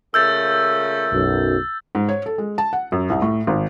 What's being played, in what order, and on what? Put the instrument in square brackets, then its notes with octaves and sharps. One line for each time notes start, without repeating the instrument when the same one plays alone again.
[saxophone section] A#2 C#3 A3 [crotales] E6 G6 A6
[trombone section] B1 F#2
[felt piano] G#2
C#5
A4
G#3
A5
F#5
F#2
C2
A2
G#1